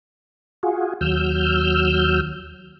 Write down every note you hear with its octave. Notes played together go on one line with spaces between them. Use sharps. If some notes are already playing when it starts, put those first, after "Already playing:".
F4 F#4 G#4
D#2 F#3 E6 F6 G6